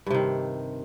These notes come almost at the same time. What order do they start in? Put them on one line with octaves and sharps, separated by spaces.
G2 C3 D#3